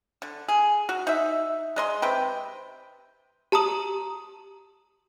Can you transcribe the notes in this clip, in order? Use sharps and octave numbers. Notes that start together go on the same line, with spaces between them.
D3
G#4
F#4
D#4 E5
G#3 D#5 C6
C3 B4 G5
G4 A5 A#5 D#6 F#7